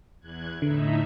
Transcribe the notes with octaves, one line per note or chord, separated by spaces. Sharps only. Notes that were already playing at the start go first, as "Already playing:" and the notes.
E2 F#6 G#6
A2 D3 D#4 E5